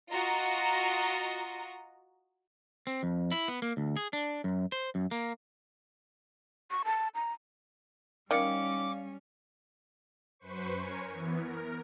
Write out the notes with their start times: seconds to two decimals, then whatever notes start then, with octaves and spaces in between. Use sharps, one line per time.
0.11 F4 F#4 D#5 A#5
2.87 C4
3.03 F2
3.31 E4
3.48 B3
3.62 A#3
3.77 D2
3.97 G#4
4.13 D4
4.44 F#2
4.72 C5
4.95 F#2
5.11 A#3
6.71 C#6
6.85 A5
7.15 A#5
8.31 D#3 G3 C#4 D5 F5 D6 C#7
10.39 F#2 B4 C5 C#6
10.79 A#4 C#5 G#5 C#6
11.08 E3 B3
11.40 A#4